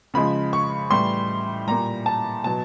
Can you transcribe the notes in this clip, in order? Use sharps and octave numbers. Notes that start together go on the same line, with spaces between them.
C#3 F3 G#3 B5
C#6
A2 E3 G3 C6
A#2 G3 A#5
A5
B2 F#3 A5